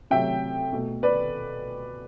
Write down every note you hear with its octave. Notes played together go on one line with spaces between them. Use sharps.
C3 F#3 A3 E5 G5
B2 A3
B4 D5